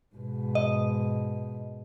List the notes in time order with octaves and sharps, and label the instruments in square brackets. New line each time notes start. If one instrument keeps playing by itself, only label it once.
[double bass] G#2 B2
[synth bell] D#5